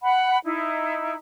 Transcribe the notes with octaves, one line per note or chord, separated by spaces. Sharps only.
F#5 B5
D#4 E4